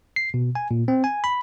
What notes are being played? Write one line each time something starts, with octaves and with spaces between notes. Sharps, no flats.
C7
B2
G#5
A#2
C4
G#5
B5